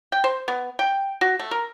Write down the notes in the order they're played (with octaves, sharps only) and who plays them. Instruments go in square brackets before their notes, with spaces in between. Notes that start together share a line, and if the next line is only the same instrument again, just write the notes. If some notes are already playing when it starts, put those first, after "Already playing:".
[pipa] G5
C5
B3
G5
F#4
A3
A#4